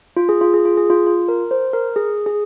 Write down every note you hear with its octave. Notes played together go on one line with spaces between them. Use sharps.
F4
G#4
F4
G#4
F4
G#4
F4
F4
A#4
C5
A#4
G#4
G#4